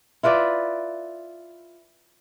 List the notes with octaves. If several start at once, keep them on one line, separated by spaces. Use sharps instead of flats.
E4 F4 B4 D5